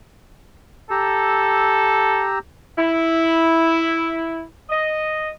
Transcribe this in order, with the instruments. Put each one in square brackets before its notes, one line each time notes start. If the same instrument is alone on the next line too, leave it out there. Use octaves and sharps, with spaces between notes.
[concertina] G4 A#5 E6 [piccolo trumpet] A4
[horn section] E4
D#5